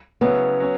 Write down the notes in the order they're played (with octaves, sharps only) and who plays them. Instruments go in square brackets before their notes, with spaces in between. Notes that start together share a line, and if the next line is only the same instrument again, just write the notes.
[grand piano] C#3 F#3 C#4 E4 [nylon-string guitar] B3
[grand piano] F#3 C#4